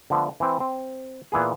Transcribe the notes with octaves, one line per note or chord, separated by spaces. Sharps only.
D3 F3 A3 B3
E3 C4
C4
A#2 E3 B3 G#4